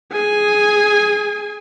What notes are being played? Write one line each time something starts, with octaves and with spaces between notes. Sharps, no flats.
G#4 G#5